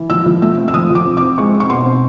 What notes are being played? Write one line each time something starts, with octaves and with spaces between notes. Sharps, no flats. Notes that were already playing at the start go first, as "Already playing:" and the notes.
Already playing: E3
F3 E6
F3
A3 E6
C4
E6
F3 D#6
F3 D6
C4
C4 D6
G#3 C#6
C4
C#6
B2 C6
C4